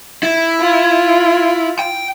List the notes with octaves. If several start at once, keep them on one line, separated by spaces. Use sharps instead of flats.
E4
F4
G5